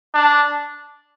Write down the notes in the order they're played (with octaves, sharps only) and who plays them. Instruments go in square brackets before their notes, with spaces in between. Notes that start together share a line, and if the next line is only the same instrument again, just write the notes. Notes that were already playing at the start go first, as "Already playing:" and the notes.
[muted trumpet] D4